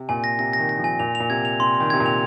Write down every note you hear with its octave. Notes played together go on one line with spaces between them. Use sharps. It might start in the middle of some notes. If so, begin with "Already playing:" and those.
Already playing: C3
A#2 G#5
A#6
C3 A#6
A#6
D#3
A#6
F3
G#5
A#2 F7
F7
A#2
C3 G#6
F7
C3 C6
C6
D#3
C3 G#6
A#2
F7